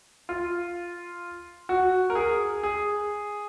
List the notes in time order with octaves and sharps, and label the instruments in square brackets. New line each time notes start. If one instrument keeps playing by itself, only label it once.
[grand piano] F4
F#4
A#4
G#4
G#4